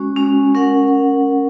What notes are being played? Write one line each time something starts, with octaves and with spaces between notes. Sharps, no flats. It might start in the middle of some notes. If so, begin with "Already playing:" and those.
Already playing: G#3 C#4 F#4
G#3 C#4 F#4
C#4 A#4 F#5